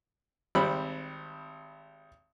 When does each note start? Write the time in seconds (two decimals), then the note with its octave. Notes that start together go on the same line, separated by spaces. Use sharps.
0.55 G#1 G3 C4 B5